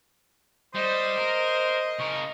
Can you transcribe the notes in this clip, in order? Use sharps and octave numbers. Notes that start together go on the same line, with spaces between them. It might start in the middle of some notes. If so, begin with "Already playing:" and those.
G3 C5 D#5
A#4
C#3 A#4 C#6